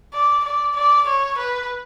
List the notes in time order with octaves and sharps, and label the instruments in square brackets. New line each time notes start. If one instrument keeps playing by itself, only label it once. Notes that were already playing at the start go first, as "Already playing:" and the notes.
[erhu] D5
D5
D5
C#5
B4